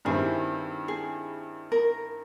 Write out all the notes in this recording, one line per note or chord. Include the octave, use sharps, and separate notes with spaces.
G2 D#3 G3 C4 E4 G#4
G#4
A#4